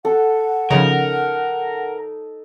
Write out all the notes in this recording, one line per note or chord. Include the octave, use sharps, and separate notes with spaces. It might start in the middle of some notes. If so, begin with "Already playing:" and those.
A4 F#5
C#3 F3 D#4 A#4 D#5